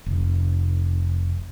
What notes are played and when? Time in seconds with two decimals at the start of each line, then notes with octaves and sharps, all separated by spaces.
0.06 F1